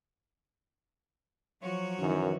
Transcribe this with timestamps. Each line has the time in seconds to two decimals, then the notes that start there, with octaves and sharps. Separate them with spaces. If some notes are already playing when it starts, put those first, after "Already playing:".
1.62 F3 F#3 F#4 C#5
2.00 F#2 D#3 E3